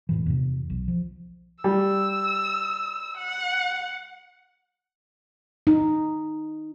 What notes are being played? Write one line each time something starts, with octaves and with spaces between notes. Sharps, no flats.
E1 A2 E3
E2 C3
B1
F3
G3 E6
F#5
D#4